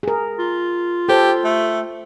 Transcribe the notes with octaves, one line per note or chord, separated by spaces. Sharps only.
G#4 A#4
F4
G4 A4 C5
A3